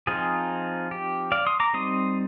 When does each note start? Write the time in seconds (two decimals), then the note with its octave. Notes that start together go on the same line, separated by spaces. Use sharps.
0.07 F3 C4 D#4 F4 G#4
0.91 G4
1.32 D5 F5
1.47 C6 D#6
1.60 A#5 D6
1.74 G3 C4 D#4 C6 D#6